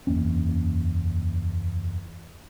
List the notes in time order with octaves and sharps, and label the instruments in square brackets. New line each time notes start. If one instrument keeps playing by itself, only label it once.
[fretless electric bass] F#1 E2 A#3 C#4